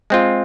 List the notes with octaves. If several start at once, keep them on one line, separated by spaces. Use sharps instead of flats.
G#3 C4 F4